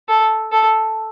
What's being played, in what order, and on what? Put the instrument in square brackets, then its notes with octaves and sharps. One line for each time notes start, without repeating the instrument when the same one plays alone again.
[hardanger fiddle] A4
A4